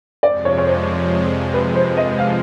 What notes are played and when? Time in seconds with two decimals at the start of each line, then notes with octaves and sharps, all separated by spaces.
0.23 F2 C3 F3 G#3 D5
0.45 C#5
0.58 C#5
0.67 C5
1.54 B4
1.75 C5
1.97 D#5
2.19 F5